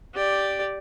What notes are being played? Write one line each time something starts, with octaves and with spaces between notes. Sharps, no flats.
G4 D5